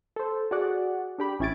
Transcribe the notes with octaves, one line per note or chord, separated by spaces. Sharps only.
A4 C5
F#4 G#4 D5 F#5
D4 G4 B5
A1 C#4 E4 G#6 A6 D7